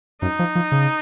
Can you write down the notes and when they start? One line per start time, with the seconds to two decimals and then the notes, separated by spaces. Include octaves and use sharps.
0.22 F#2 D#4
0.39 F3
0.55 F3
0.72 C#3